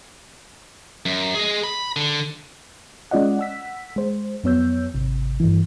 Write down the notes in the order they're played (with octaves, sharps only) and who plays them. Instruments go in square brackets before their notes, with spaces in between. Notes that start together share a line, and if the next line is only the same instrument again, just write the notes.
[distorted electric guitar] F#2
G#4 D#5
B5
D3
[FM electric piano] G#3 C#4 F4 D5 D#5 F#5
F#5 E6 B6
G#3 C5
F2 F#3 B3 C#5 E6 G6
G#1 C3
G2 E3